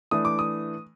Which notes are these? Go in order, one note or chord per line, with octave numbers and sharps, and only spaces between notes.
E3 A3 D4 D#6
D6
D#6